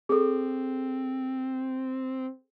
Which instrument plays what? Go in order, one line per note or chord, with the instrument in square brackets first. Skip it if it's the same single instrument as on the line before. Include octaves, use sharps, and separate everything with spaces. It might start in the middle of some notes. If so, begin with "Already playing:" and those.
[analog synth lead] C4 [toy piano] G#4 A4